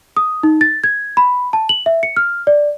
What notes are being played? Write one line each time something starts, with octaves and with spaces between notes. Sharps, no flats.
D#6
D#4
A6
G#6
B5
A5
F#7
E5
C#7
F6
D5